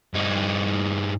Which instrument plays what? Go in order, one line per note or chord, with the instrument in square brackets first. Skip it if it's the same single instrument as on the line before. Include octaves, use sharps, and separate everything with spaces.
[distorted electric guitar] G2 D#4